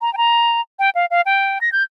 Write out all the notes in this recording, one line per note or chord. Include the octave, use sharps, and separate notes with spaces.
A#5
G5
A#5
G5
F5
F5
G5
A#6
G6